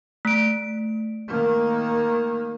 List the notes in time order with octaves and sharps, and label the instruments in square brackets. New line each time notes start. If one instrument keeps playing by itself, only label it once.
[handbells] A3 D7
[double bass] D#3 A#3